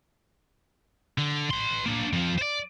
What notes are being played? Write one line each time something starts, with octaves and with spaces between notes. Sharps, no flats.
D3
B4 C6
A#3 D4
F2 F3
C5 D5